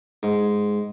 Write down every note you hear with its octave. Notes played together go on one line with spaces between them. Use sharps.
G#2